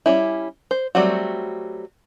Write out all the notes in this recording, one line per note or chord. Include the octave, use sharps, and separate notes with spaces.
G3 C#4 E4
C5
F#3 G3 A3 C4 F#4